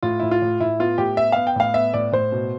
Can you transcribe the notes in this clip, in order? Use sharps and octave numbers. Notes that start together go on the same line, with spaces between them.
A2 F4
A2 E4
F4
A2
A2 E4
B3 F4
A2 G4
B3 E5
B3 F5
G5
A2 F5
B3 E5
A2 D5
A2 C5
B2